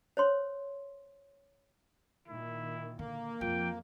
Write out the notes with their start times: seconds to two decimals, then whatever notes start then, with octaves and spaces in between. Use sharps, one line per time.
0.17 C5 C#5 C6
2.28 A#2 D#3 E4
2.99 D3 A#3
3.41 F2 F3 G5